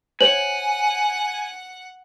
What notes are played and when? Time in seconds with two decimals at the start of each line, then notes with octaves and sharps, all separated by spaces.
0.21 C5 C#5 F#5 G#5 F#7